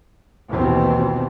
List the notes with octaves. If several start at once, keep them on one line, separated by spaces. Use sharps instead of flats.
A#1 D#2 B2 E3 C4